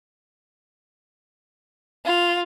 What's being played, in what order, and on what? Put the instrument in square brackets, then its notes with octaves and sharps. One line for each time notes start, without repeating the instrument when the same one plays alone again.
[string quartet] F4